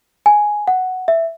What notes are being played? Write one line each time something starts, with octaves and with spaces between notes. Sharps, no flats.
G#5
F#5
E5